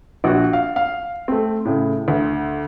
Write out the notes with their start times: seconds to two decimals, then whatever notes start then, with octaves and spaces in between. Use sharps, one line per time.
0.24 A#1 F#4
0.53 F5
0.76 F5
1.28 A3 C4
1.65 A2 C#3
2.08 D2